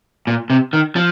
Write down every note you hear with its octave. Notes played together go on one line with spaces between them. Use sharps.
A#2
C3
D#3
F3